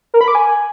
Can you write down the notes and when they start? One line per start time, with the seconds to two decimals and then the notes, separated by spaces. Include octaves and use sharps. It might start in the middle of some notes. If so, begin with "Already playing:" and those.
0.14 A#4
0.21 B5
0.28 D6
0.35 G#5